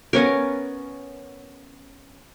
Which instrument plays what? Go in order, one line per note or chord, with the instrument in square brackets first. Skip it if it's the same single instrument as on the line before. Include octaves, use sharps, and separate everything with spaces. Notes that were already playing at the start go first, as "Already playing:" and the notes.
[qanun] B3 C#4 A#4